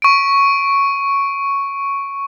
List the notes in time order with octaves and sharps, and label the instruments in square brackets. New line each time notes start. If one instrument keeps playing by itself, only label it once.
[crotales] C#6 D7